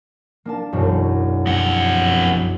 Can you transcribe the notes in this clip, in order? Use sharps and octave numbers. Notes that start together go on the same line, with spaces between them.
A#3 D4 A5
E1 B1 F#2
F2 F#5